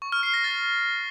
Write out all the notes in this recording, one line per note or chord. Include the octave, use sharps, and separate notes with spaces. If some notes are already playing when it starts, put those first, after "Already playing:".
C#6
F6
C7
A#6
A6